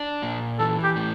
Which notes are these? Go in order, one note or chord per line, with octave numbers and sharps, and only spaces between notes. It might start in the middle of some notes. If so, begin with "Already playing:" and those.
Already playing: D4
A#2
E3 A4
G4
A2